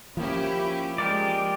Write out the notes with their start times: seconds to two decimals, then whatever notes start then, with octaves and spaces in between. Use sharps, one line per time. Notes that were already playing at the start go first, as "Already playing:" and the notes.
0.17 F3 A#3 C#4 E4 G4
0.98 G#3 G4 A#4 D5